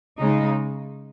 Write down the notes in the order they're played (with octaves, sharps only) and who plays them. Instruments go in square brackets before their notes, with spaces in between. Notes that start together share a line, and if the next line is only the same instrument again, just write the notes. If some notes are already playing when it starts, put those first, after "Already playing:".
[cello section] C#3 G#3 D#4